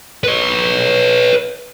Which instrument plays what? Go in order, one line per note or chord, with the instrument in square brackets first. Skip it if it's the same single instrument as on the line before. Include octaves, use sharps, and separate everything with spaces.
[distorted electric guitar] B4 C#5